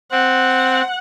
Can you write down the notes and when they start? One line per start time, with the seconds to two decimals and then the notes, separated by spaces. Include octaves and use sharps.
0.11 C4 F#5